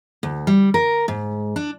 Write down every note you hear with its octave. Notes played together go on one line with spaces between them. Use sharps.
D2
G3
A#4
G#2
D4